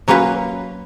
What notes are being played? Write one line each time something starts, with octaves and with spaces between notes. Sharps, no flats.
F#3 A#3 C#4 F4 B4